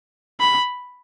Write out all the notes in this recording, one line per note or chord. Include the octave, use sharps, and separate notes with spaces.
B5